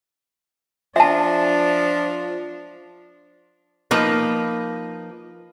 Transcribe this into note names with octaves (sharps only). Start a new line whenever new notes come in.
F3 D4 E5 A5
F3 A#3 D#4 B4